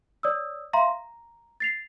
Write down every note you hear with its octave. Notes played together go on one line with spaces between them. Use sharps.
C#5 D5 D#6 E6
E5 F5 A#5 C6
A#5
A6 C7 F7